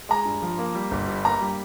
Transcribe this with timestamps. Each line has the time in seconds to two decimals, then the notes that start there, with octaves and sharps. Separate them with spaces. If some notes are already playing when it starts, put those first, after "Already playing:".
0.09 G#3 A#5
0.25 G2
0.42 F3
0.58 A#3
0.75 G3
0.91 G1
1.08 G2
1.25 A#3 A#5
1.41 G3